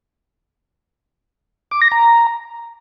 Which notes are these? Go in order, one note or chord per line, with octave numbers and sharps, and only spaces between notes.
D6
A#6
A#5